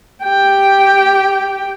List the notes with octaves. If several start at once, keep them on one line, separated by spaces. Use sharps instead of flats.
G4 G5